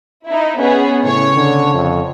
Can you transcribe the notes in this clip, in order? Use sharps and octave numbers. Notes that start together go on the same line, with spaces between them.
D#4 E4
B3 C#4 G#4
A2 C#3 C#5
D3
F2